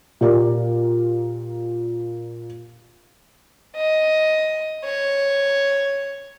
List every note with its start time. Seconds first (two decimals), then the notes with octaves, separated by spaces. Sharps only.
0.21 A#2 G4 A#4 D5
3.77 D#5
4.85 C#5